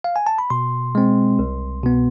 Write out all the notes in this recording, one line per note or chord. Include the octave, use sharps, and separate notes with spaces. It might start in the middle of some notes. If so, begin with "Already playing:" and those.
F5
G#5
A5
B5
B2 C6
G#3 C4
C2
B2 B3